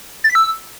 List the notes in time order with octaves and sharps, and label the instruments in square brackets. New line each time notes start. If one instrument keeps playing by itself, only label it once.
[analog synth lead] A6
B6
E6